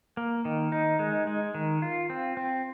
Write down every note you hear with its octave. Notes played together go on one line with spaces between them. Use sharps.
A#3
D#3
D#4
G#3
G#3
D#3
F4
C4
C4